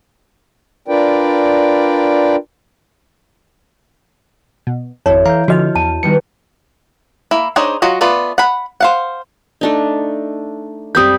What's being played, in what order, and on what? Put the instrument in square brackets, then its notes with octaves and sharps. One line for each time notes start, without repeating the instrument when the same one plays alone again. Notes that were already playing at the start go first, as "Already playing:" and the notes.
[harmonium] D4 F4 A#4 B4 D5 G5
[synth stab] B2
[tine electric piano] G#1 F2 [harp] E4 [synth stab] A4 [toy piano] C#5
[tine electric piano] E3 F5 A#5 [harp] G6 D7
[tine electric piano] D3 [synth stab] F3 F6 [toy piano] F#4 D#5 [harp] A4
[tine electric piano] E2 [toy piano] A5
[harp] D#3 G3 B3 [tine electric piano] C#7
[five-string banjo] A#3 E4
D4 D#4 G#4 C5 C#5
F#3 F4 F#4 D#5
A3 B3 F4 B4 D5
F#5 B5
C5 F5 F#5
[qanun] A3 D4 D#4
[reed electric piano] F#2 D#6 G6 [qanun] G3 C4 B5